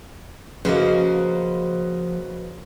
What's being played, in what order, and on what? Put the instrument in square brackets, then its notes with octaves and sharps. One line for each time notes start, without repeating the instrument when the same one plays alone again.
[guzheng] C#3 A#3 [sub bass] F3 [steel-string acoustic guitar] F#4 C5 [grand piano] B4 D#5